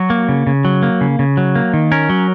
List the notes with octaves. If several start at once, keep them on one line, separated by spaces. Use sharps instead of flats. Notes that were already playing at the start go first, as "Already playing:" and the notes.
Already playing: F#3 F#4
A#3
C#3
C#3
F#3
A#3
C#3
C#3
F#3
A#3
D#3
C#4 A#4
F#3